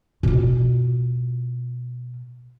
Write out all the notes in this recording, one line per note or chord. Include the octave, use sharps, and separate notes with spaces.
B2 F4